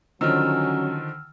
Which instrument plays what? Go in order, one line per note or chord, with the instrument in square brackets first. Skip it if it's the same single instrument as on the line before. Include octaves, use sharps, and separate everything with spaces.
[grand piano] D3 D#3 F3 [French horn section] F#3 C#4 [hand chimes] E6 F6